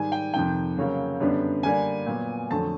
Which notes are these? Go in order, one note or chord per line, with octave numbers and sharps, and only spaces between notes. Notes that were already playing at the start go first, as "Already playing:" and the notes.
Already playing: G#2 D#3 G3 G#5
G5
F2 C3 D#3 G5
C#3 F#3 A#3 C#4
F#2 D3 G3 B3 D4
D3 G3 A#3 D4 G#5
A#2 F#3 B3
F2 D3 F#3 A3 A5